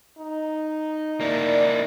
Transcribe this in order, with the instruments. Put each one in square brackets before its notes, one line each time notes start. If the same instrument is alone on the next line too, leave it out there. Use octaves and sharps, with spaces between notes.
[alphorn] D#4
[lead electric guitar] A#3 E4 [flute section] D5